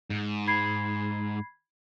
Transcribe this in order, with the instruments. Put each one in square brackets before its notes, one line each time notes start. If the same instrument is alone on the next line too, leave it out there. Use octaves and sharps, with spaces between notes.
[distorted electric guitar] G#2
[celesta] B5 G#6 C7